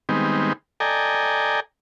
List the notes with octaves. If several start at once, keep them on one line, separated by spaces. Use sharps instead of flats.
D#3 G3 G#3 B3 C4 D#4
A4 D5 D#5 G5 G#5 A#5